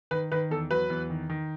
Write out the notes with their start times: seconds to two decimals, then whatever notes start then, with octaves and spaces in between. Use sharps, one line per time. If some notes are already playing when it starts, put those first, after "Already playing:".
0.11 D#3 B4
0.32 D#3 B4
0.50 E2 A4
0.71 F#3 B4
0.90 E2
1.10 D#3
1.30 D#3